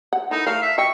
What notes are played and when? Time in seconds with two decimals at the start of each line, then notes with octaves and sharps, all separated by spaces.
0.13 F#5
0.31 D#4 E4 A4 A#4
0.47 A3 A4 A#4 F5
0.62 E5
0.78 D#5 E5 G5 C#6